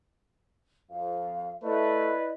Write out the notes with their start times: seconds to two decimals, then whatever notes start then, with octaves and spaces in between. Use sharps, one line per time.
0.91 F2 F5
1.63 A3 E4 B4 D5 D#5